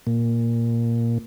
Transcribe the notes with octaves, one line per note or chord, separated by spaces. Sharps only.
A#2